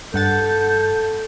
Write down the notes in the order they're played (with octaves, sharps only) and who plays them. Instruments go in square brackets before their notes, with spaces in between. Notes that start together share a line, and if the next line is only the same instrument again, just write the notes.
[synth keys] G2 F#5 A6 [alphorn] A4 [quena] G6